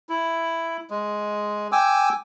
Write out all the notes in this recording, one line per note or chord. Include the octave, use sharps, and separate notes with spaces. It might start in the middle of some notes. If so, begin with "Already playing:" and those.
E4
G#3
G5 G#5 D6 E6